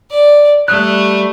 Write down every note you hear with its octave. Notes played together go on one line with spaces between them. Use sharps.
D5
G3 A3 D#6 F#6